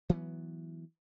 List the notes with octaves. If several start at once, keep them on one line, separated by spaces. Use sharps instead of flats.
E3 F#3 A3 B3